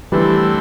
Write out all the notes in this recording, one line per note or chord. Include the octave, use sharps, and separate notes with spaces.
D3 E3 G3 A3 C4 E4